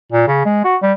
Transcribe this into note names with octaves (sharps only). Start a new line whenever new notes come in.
A#2
C#3
G#3
F#4
G3